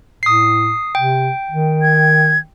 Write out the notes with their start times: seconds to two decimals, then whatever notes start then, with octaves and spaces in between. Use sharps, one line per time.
0.23 A2 D#6 C7
0.95 C3 G5
1.51 D#3
1.82 G#6